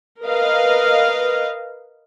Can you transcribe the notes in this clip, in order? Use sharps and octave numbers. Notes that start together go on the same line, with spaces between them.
A#4 B4 D#5 F5